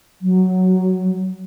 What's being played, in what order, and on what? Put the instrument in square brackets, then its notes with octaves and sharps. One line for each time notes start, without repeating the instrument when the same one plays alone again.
[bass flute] F#3